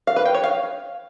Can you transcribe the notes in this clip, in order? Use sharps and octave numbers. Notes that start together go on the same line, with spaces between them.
F5
B4
G5
C#5
F5